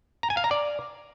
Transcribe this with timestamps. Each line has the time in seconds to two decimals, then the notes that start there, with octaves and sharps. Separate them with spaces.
0.23 A#5
0.30 G#5
0.37 F5
0.44 A#5
0.51 D5